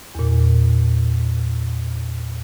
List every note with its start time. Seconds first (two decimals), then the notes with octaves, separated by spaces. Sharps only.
0.15 E2 A#2